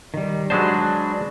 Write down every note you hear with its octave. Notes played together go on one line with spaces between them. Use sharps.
D#3 G3
F#3 G#3 D4 F#4 B4 C5